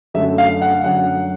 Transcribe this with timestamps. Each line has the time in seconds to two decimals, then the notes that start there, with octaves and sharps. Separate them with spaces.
0.14 F#2 D3 F#3 A3 E5
0.38 F5
0.62 F#5
0.84 F#2 D3 F#3 A3 F#5